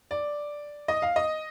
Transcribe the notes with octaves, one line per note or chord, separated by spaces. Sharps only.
D5
D#5
F5
D#5